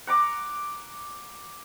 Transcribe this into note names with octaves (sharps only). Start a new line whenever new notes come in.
F#5 A#5 D6